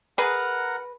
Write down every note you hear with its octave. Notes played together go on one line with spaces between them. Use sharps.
G#4 A#4 B4 F#5 A#5